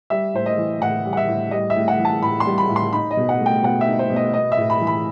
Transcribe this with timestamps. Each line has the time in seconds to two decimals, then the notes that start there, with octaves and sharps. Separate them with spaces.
0.10 G3 E5
0.34 A2 C5
0.46 D#5
0.58 E3
0.81 A2 F#5
1.06 G3
1.13 F#5
1.17 E5
1.28 A2
1.51 G3 D#5
1.70 E5
1.76 A2
1.88 F#5
1.99 E3
2.05 A5
2.22 A2 B5
2.40 C6
2.46 G3
2.58 B5
2.69 A2
2.76 C6
2.93 D#4 B5
3.11 D#5
3.17 B2
3.29 F#5
3.41 A3
3.46 G5
3.63 B2 F#5
3.81 E5
3.87 D#4
3.99 C5
4.10 B2
4.16 D#5
4.34 B3 D#5
4.52 E5
4.57 A2
4.70 B5
4.81 E3
4.87 B5